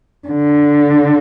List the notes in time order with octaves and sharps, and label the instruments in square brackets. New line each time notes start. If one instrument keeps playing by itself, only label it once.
[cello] D3